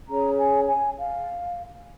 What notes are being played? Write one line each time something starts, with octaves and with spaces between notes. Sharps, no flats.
C#4 G#4 C#5 A#5
G#5
G#5
F5